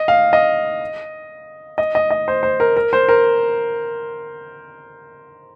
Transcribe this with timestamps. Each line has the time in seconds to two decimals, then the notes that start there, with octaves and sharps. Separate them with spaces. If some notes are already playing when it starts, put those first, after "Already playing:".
Already playing: D#5
0.08 F5
0.33 D#5
1.78 D#5
1.95 D#5
2.10 D#5
2.28 C5
2.43 C5
2.60 A#4
2.77 A#4
2.93 C5
3.09 A#4